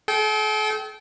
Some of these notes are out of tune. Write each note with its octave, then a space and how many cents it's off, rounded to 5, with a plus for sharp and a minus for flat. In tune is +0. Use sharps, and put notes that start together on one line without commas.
A4 -45 G5 -15